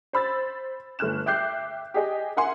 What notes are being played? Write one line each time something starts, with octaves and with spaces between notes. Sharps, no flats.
C5 B5 E6 A6
G1 A3 F6 F#6 E7
E5 G5 D6 F#6 G6 C7
G4 G#4 D#5 G5
A#4 E5 F#5 G#5 C6